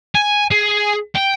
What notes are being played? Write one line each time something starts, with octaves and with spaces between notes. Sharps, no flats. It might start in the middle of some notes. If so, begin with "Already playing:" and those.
G#5
G#4
G5